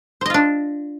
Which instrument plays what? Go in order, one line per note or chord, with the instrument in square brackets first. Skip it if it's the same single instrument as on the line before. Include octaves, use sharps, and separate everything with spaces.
[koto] C5
D#5
F4
D4